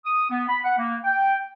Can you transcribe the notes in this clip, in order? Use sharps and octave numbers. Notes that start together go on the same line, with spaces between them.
D#6
B3
B5
F#5
A#3
G5